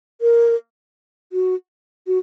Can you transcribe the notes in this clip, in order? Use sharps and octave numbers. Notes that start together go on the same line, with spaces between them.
A#4
F#4
F#4